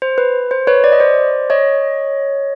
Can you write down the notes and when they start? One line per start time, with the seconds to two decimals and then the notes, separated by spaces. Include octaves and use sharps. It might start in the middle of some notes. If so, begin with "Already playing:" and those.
0.02 C5
0.18 B4
0.51 C5
0.67 B4 C#5
0.84 D5
0.92 D#5
1.00 C5 D5
1.50 C#5 D#5